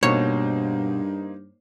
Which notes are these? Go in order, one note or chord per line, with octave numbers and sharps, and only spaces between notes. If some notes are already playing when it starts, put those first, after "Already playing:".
G2 B2 A#3 D#4 C5 C#5